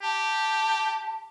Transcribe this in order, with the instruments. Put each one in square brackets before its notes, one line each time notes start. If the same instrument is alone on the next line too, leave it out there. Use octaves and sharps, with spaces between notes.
[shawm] G4 [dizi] A5